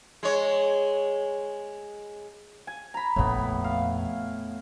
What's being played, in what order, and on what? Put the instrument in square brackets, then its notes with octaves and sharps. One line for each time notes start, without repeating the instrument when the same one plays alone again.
[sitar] G#3 C#5
[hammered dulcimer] G#5
A#5 B5
[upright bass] A#1 F2 [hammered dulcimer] A2 B3
[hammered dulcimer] F5